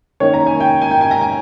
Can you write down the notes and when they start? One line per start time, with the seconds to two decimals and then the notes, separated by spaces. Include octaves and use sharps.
0.20 D#3 A#3 C#4 C#5
0.34 A#5
0.47 G#5
0.60 G5
0.82 G#5
0.91 G5
1.01 G#5
1.11 A#5
1.21 G#5